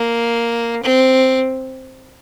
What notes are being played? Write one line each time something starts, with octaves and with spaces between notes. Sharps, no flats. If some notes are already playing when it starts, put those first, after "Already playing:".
Already playing: A#3
C4